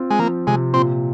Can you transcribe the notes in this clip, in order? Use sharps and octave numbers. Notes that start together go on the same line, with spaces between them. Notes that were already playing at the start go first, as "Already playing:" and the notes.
Already playing: C4 F4
G#3
F3 A#3
C3 G#3
A#2 C4